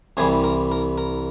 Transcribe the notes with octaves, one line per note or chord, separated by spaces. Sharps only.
C2 C3 E3 G3 G#4
A#4
A#4
A#4